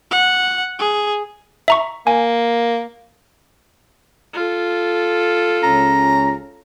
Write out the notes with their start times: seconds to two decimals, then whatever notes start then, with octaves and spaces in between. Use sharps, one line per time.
0.11 F#5
0.79 G#4
1.68 E5 A#5 C#6
2.07 A#3 G#5
4.34 F4 A4
5.63 C#2 C#4 A#5